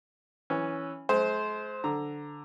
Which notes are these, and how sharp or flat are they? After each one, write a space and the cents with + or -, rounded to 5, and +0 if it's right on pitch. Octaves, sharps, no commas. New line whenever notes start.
E3 -5 C#4 +0
G#3 +45 C5 +0
D3 +0 A#5 +0